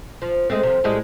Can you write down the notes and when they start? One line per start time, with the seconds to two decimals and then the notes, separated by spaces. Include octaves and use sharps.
0.22 F3
0.50 G#3 A3 C4
0.63 C3 F3
0.84 A2 G3 G#3